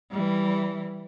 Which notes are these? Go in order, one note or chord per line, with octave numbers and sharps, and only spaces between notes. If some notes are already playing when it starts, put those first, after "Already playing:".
E3 G3